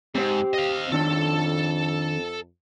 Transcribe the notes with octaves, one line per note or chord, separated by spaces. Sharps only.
G#2 C4 G4 C5
D#5 F5
F2 D#3 C4 D4 A4